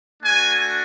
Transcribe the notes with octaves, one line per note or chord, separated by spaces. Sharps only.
A3 D4 F#4 G#5